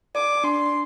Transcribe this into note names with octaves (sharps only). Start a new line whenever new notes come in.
D5 D6
D4 C6